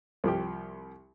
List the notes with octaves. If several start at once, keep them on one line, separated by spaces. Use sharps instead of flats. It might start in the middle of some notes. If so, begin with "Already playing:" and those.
C2 F3 G4